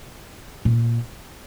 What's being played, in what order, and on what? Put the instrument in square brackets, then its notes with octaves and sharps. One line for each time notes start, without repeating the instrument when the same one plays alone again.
[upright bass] A#2